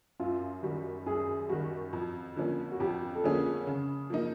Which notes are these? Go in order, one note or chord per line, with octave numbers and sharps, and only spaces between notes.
F#2 F4
D#3 G3 F#4
F#2 G#4
D#3 G3 F#4
F2
D3 F3 A#3 C#4
F#4
F2 G4
A4
D3 F3 A#3 C#4 G#4
C#3
F3 A#3 D#4